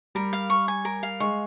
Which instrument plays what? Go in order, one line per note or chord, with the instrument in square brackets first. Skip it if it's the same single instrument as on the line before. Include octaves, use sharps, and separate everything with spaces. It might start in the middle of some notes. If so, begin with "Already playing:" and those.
[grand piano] G3 [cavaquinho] A#4
[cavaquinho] F5
C#6
G#5
A#4
F5
[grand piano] G#3 [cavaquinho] C#6